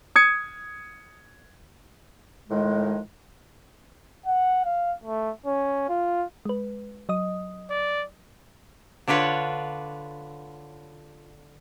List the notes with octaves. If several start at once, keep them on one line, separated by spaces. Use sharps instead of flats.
D#6 G#6 C#7
A2 D#3 F3 G#3
F#5
F5
A3
C#4
F4
G#3 B4
F#3 D#5 D#6
D5
D3 D4 F4 B4 C#5